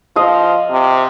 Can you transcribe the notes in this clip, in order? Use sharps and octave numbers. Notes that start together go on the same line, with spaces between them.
F3 D#5 F5
C3